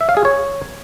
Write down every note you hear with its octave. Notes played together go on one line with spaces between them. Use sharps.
E5
F5
G#4
C#5